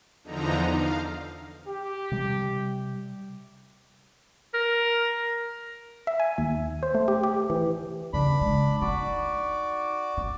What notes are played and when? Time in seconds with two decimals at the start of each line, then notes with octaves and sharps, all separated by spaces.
0.24 E2 D3 F3 D#4 A#5
0.71 F5
1.67 G4
2.12 C3 G3
4.54 A#4
6.07 E5
6.20 G#5
6.38 D#2
6.83 C5
6.95 A3
7.08 G4
7.23 G4
7.50 E3
8.13 G2 C#3 D4 B5
8.41 G#3
8.81 D#4 F#4 D5
10.17 D#4